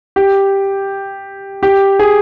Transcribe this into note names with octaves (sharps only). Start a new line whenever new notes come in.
G4
G4
G#4